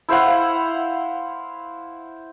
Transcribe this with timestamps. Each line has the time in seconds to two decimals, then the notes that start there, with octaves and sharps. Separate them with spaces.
0.09 E4 C5 F5 F#5